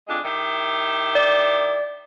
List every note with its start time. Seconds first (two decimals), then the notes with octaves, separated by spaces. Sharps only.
0.08 F2 G#3 D4
0.24 D#3 E4 G4
1.15 D5